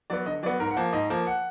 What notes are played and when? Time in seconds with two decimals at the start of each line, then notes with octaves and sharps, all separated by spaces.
0.10 F#3 B3 D5
0.26 D3 D#5
0.43 F#3 D5
0.46 B3
0.60 G#2 A#4
0.71 F#5
0.77 F3 A#3
0.93 G#2 D#5
1.10 F3 A#3
1.27 F#5